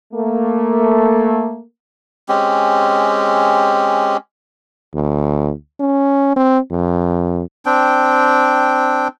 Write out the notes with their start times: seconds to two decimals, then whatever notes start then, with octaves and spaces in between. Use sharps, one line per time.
0.13 A3 A#3
2.29 G#3 C4 C#4 G4
4.94 D2
5.80 C#4
6.36 C4
6.71 F2
7.66 C4 D4 G5